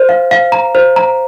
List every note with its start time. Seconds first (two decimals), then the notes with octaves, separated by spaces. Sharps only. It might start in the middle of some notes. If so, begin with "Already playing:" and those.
Already playing: C5
0.09 F5
0.31 F5
0.52 A#5
0.75 C5
0.96 A#5